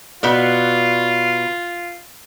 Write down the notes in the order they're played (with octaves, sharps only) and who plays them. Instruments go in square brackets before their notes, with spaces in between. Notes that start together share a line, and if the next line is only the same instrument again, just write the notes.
[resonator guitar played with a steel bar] B2 B3 D5 [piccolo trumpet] F4